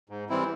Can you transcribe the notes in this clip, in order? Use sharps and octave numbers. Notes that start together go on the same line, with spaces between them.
G#2
E3 G3 C4 E4